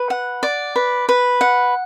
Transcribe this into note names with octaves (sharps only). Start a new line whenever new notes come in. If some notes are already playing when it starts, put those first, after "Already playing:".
Already playing: B4
F#5
D5
B4
B4
F#5